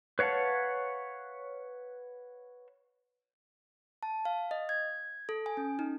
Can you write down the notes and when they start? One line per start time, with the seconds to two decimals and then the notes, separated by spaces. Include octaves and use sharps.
0.19 B4 C#5 F5 F#5 A5
4.03 A5
4.25 F5
4.51 D#5
4.69 G#6
5.29 A4
5.46 G#5
5.57 C#4
5.79 D#4